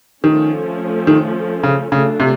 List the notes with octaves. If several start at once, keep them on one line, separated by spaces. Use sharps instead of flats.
D#3 F3 A3 C#4
D#3
C#3
C#3 F#3 A3 D4 F4
C3